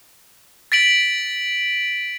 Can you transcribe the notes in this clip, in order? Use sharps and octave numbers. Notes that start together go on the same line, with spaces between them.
A6 B6 D7 F#7